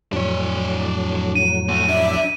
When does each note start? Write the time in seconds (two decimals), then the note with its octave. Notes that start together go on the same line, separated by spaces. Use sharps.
0.13 F2 A2 F#3 D4 C#5
1.35 D#7
1.69 A3 F#4
1.89 D4 E5